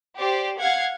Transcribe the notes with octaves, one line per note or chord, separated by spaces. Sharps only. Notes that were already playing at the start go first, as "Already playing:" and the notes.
G4 C5 D5
F5 F#5 G#6